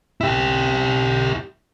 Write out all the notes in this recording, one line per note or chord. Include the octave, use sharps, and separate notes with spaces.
E4 G4